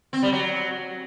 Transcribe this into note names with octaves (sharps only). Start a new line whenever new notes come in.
C4
G3
F#3